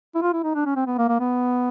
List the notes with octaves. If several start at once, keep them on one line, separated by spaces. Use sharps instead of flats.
E4
F4
E4
D#4
D4
C#4
C4
B3
A#3
A#3
B3